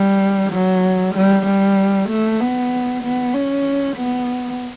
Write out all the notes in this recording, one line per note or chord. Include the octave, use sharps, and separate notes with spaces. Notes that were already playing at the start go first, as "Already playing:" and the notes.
Already playing: G3
F#3
G3
G3
A3
B3
B3
C#4
B3